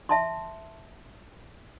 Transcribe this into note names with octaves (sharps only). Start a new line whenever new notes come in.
E5 A5 C6